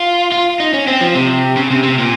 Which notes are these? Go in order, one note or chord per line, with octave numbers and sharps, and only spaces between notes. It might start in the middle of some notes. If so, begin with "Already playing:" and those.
Already playing: F4
F4
D#4
C#4
C4
F3
C3
C#3
C3
C3
A#2